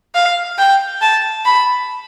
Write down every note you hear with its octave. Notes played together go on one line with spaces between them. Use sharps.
F5
G5
A5
B5